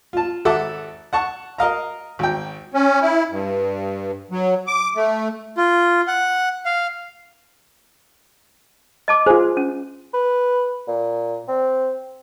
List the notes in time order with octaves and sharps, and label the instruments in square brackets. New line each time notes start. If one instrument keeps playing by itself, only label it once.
[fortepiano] F4 A5
G#1 A4 E5 F#5 A5 D6
F#5 A5 C#6
A#4 D#5 F5 A#5
G#1 G5
[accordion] C#4
E4
G2
F#3
D6
A3
[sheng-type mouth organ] F4
F#5
F5
[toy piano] D#5 A5 D6
[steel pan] F4 G#4 [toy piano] C5
[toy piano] C#4
[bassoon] B4
A#2
C4